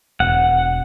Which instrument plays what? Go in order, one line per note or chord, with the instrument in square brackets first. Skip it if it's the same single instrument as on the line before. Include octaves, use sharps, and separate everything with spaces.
[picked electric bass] E1 [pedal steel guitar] F#5